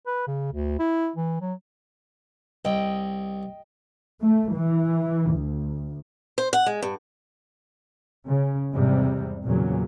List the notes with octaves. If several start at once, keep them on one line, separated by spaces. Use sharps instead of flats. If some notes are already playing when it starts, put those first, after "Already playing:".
B4
C#3
D2
E4
E3
F#3
C2 D#5 G5
A3
E3
D2
C5
F#5
G#3
G2
C#3
E2 G#2 C3 G3
E2 A#2 C#3 F#3